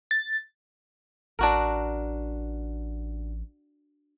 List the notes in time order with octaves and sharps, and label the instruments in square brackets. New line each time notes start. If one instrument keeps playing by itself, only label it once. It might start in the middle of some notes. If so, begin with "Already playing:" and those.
[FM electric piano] A6
[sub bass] A1 [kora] D4 F#4 A#4